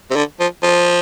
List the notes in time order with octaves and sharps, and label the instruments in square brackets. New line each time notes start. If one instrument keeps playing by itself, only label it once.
[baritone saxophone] C3
D3
F3
F3